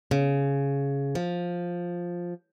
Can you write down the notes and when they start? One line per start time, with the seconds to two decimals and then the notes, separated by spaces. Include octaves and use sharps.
0.11 C#3
1.15 F3